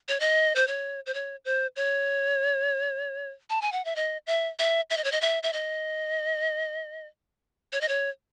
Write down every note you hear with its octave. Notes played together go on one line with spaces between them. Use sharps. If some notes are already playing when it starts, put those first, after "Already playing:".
C#5
D#5
C5
C#5
C5
C#5
C5
C#5
A5
G#5
F#5
E5
D#5
E5
E5
E5
D#5
C#5
D#5
E5
E5
D#5
C#5
D#5
C#5